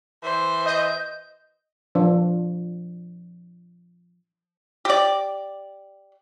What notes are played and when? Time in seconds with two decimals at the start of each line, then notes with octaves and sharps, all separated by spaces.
0.23 E3 C5
0.66 D#5 G6
1.95 F3 D4
4.85 G4 D5